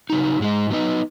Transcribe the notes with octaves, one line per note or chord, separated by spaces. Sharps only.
C#3 F#3 D#4
G#2 G#3 D#4
F#3 B3 D#4